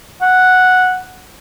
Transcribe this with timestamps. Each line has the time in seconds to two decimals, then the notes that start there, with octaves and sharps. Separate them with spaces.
0.22 F#5